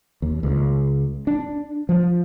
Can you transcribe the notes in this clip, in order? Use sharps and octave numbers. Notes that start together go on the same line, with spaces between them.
D#2
C#2
D4
F3